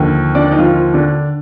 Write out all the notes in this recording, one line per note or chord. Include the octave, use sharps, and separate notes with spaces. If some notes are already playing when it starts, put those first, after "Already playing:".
Already playing: D#2 D3 F3
D4 D5
D#4
F3 F4
D3 D4